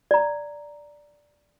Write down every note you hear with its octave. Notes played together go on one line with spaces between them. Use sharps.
D5 A#5